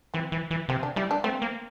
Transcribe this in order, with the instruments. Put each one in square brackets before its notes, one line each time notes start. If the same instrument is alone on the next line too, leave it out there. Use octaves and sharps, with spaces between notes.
[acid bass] E3 [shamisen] C4
[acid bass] E3
E3
[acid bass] C3 [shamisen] C4
[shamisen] D4
[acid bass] G3 [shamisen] E4
[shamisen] D4
[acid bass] A3 [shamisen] C4
[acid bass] A#3